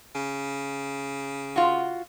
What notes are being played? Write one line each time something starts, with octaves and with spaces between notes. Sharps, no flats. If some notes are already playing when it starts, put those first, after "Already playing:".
C#3
F4 F#4